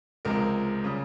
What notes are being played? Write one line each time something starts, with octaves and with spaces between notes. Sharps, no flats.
C#2 C3 F3 G#3 A#4
C#3 G3